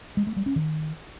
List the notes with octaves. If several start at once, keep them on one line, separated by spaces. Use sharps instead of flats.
G#3
A3
G3
C#4
D#3